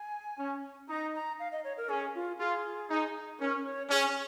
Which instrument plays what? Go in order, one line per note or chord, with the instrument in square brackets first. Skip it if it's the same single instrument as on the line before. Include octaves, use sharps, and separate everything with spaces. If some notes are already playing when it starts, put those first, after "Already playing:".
Already playing: [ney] G#5
[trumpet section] C#4
[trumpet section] D#4 [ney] A#5
[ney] A#5
F5
D#5
C#5
A#4
[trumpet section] C#4 [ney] G#4
[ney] F4
[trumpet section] F4 [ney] G#4
[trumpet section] D#4
[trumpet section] C#4 [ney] A#4
[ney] C#5
[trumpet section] C#4 [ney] G#4